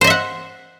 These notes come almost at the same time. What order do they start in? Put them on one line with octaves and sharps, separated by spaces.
C5 D#5 E5 F#5